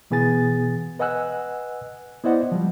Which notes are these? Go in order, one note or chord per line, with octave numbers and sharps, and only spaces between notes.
B2 E3 B3 G#4 G#5 A6
B4 D#5 F#5 G#5 E6 F#6
B3 E4 C5 D5 D#5 F#5
F3 G3